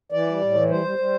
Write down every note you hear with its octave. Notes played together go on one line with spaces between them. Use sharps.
E3 D5
G3
A2
E3
G3 C5
G3
G3